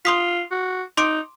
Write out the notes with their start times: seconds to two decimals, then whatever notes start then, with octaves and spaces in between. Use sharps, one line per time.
0.05 F4 C6 D#6 B6
0.51 F#4
0.97 D#4 C6 D6 D7